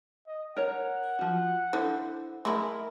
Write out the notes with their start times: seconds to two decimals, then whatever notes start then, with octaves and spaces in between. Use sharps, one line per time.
0.27 D#5
0.57 A#4 C#5 F#5 A#5
1.19 F3 F#4
1.73 D3 E4 C5
2.45 G#3 A3 E4 A#4